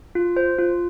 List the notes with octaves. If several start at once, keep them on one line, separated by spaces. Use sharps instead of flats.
F4
C5
F4